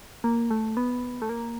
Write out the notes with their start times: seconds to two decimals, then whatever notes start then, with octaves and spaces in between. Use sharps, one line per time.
0.24 A#3
0.51 A3
0.77 B3
1.22 A3
1.29 A#3